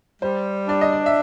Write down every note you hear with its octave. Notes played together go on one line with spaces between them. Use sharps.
G3 C5
D4 D5
D#5
D5
E5